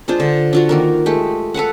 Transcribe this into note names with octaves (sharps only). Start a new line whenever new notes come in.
G#3 D4 F4 C5
D3
D4 F4 F#4
D#3 A#3 A#4
G#3 A3 G4
A4 B4 F5 F#5